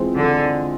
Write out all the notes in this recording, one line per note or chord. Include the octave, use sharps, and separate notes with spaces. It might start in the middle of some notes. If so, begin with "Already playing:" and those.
Already playing: E3 G#3 C4 F4
D3